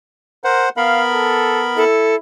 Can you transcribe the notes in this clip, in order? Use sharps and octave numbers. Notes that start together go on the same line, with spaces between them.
A#4 C5 F#5
B3 A#4 F5 B5
A4
E4 A4